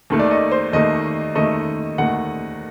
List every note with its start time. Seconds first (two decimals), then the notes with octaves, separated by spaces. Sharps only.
0.10 D#2 D#3 A3
0.19 D5
0.31 D#5
0.51 C5
0.73 D#2 D#3 A3 D#5
1.35 D#2 D#3 A3 D#5
1.98 D#2 D#3 A3 F#5